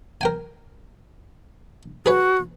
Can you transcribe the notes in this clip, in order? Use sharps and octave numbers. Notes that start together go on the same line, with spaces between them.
A#4 G5 G#5
F#4 G#4 B4 C#5